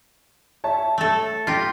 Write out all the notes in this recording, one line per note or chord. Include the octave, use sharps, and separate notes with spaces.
C#5 E5 A5
A3 A4
F4 G4 A#6 B6